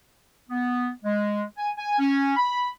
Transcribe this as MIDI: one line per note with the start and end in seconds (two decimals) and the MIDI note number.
0.50 0.89 59
1.04 1.44 56
1.58 1.70 80
1.78 1.98 80
1.99 2.33 61
2.37 2.68 83